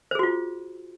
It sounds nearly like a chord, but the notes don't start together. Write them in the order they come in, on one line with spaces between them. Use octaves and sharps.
C5 G#4 F#4 F4